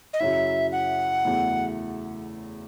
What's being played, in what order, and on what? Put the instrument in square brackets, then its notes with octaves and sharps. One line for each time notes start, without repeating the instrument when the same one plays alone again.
[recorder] D#5
[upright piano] F#2 C#3 F#3 C#4 E4 [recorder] E5
[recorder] F#5
[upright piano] E2 C#3 F#3 A3 E4